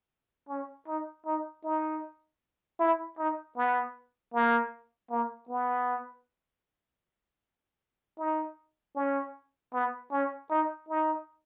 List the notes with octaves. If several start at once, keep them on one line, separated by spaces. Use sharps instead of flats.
C#4
D#4
D#4
D#4
E4
D#4
B3
A#3
A#3
B3
D#4
C#4
B3
C#4
D#4
D#4